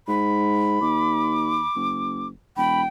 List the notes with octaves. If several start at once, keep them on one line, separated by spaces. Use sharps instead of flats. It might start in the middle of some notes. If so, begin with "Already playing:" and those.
G#2 B5
D#2 D6
F#1
E1 G5 B5